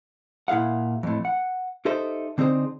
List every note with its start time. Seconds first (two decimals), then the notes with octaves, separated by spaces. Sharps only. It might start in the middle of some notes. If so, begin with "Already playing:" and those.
0.48 A#2 E4 G#4 F5 F#5
1.03 F2 A2
1.25 F#5
1.85 D#4 G4 A4 C5 D#5 E5
2.38 D3 C4 D#4 G#4 C5